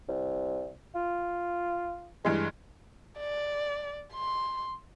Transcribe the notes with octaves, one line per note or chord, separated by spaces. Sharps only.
C2
F4
G2 E3 G#3 G#4
D5
C6